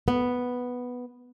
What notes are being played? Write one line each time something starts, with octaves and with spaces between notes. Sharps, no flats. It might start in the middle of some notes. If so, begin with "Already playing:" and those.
B3